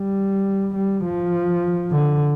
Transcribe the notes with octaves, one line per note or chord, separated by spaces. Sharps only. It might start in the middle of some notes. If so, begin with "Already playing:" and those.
Already playing: G3
G3
F3
D3